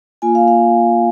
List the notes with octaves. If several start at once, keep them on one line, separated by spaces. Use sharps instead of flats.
A#3 F4 G#5
F5
F5